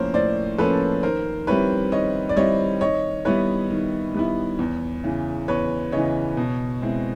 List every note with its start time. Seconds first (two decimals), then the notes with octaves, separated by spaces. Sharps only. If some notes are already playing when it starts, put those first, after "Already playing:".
Already playing: A2 F3 A#3 C#4 A#4 C5 C#5
0.14 A2 C5 D5
0.58 F3 A#3 C#4 A4 B4
1.03 D#3 A#4 C5
1.47 G3 C4 E4 B4 C#5
1.92 D#3 C#5 D#5
2.29 D5
2.36 G3 C4 E4 C#5 D#5
2.81 D#3 C#5 D#5
3.25 G3 B3 E4 B4 C#5
3.70 D#3
4.14 G3 B3 E4
4.59 E2
5.04 C#3 E3
5.48 E2 B4 C#5
5.92 C#3 E3 C#5 D#5
6.37 B2
6.82 G#3 C4 E4